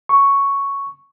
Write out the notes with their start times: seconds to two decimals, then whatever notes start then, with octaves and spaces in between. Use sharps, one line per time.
0.09 C#6